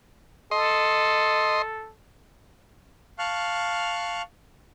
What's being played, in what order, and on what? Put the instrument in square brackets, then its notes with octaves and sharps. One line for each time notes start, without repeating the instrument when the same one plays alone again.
[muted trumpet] A4 [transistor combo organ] D#5 C6
[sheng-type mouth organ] F5 A5 C#6 F6 F#6